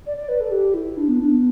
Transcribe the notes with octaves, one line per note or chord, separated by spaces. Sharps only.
D5
D5
B4
A4
G4
E4
D4
B3
D4
B3